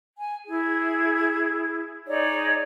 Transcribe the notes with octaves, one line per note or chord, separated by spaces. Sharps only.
G#5
E4 G#4
D#4 G#4 C#5 D5